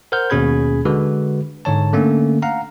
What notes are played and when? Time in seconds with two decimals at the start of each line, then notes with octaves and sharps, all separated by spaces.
0.12 A#4 C5 F#5 F6 G6
0.30 D#2 B2 C#4 G#4 B5 G#6
0.85 D3 G#3 F#4 B4
1.65 G#2 D3 C#5 A5
1.93 D3 A3 A#3 C#4
2.42 F5 F#5 A#5